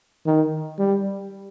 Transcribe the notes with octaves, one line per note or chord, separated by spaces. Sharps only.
D#3
G3